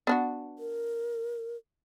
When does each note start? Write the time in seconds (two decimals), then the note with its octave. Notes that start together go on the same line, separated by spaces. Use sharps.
0.07 B3 D4 F#4
0.59 A#4